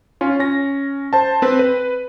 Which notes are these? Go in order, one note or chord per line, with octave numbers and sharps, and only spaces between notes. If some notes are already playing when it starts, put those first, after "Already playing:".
C#4 F4
C#4 A#6
C5 A5
C4 B4
B4